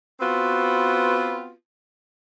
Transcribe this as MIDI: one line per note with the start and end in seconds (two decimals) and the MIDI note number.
0.21 1.51 59
0.21 1.51 60
0.21 1.51 65
0.21 1.51 66
0.21 1.51 71